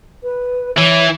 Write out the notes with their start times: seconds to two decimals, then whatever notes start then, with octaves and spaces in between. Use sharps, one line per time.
0.23 B4
0.77 E3 C#5